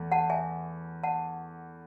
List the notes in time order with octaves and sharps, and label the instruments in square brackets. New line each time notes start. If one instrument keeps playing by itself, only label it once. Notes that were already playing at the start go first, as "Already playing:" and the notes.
Already playing: [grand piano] E2 A3
[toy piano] F#5 A5
E5 G#5
F#5 A5